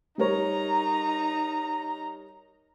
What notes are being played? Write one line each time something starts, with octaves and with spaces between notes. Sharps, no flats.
G3 D#4 A#4 C#5 A#5